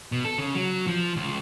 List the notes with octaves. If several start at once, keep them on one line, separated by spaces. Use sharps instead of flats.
B2
A4
C#3
F#3
F3
C#2